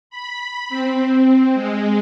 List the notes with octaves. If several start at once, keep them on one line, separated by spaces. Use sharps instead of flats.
B5
C4
G#3